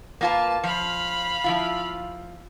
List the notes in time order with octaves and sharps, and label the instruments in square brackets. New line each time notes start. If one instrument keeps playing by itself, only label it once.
[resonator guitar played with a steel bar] A#3 F4 B4 [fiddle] A5
[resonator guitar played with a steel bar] F3 [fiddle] F5 B5
[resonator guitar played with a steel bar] F3 E4 F4